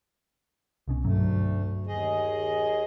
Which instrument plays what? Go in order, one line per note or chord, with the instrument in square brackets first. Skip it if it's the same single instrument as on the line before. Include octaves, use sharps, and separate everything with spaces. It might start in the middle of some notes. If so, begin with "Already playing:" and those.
[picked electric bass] C2 B2 C#4
[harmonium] D2 A3 [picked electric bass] G2 B2 F#3
[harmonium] D#2 G#4 D#5